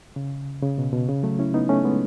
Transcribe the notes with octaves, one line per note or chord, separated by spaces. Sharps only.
C#3
C#3
B2
B2
C#3
F#3 A3
C#4 E4
B3 D#4
A3 C#4
G#3 B3